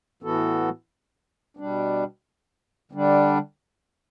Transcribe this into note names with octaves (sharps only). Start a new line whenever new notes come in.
A2 E3 B3 F#4 A4
B2 G3 D4
D3 G3 D4